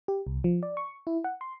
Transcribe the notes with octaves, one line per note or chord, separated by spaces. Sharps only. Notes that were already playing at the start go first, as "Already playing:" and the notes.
G4
C2
F3
D5
C#6
E4
F#5
C6